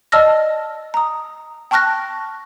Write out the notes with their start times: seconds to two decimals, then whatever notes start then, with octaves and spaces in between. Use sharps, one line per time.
0.12 D5 D#5 A5 E6 F6 A#6
0.94 A#5 D#6
1.71 G5 A5 C#6 F6 F#6 A#6